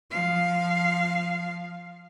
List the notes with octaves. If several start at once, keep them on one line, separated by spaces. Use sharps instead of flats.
F3 F5